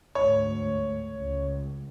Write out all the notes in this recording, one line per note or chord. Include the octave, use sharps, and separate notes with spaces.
D2 G#2 C#5
C#2